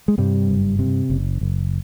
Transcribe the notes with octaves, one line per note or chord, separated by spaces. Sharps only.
G#3
G2 C3 G3
F#1
C3
F#1
F#1